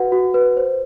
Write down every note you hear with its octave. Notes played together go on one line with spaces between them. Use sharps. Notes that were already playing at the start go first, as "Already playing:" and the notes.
Already playing: F#4 B4 F#5
F#4
B4
C5